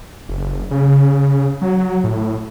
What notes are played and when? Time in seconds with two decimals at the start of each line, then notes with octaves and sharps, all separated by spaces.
0.29 F#1
0.71 C#3
1.61 F#3
2.04 A2